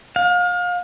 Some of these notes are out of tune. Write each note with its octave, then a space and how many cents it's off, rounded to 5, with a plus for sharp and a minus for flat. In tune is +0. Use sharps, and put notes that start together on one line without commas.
F5 +35